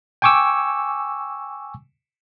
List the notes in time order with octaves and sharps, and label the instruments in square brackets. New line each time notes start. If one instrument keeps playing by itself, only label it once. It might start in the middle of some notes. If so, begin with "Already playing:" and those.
[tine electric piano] G5 G#5 C#6 D6 E6